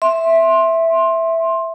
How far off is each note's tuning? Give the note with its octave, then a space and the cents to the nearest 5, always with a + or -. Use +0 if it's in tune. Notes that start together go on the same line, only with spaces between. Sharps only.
E5 +0 C6 +15